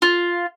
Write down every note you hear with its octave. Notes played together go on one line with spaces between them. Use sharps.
F4